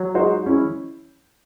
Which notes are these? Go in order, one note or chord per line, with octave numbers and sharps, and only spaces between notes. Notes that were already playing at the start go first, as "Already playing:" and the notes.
Already playing: F#3
G#3 D#4 F#4 C5
G#3 C#4 E4